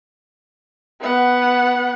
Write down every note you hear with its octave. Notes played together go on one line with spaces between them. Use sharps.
B3 F#5